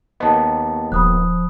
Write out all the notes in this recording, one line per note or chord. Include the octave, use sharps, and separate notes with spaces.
D#2 B3 D#5 A5
D#1 F3 B5 D#6 F#6